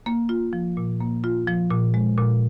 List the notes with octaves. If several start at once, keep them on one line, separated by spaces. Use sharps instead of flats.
A#3
F4
F3
A#2
A#3
F4
F3
A#2
G#3
A#2